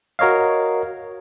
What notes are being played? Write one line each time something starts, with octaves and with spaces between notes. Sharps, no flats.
F#4 A#4 C#5 D#5 F5